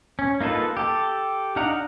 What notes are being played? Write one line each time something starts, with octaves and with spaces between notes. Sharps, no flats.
C#4
A#3 D#4 F4 A4 B4
G4 A4
D4 D#4 F5 F#5 A#5